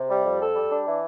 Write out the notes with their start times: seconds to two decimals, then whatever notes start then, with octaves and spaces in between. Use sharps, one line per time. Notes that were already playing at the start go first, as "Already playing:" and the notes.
Already playing: C3
0.09 G3
0.24 F2
0.40 A4
0.55 G3
0.70 D4
0.86 E3